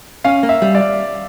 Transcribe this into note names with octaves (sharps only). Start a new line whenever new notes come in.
C#4 F5
A#3
E5
G3
D5